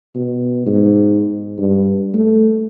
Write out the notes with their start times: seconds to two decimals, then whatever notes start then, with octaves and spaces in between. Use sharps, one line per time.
0.15 B2
0.66 G#2
1.58 G2
2.14 A3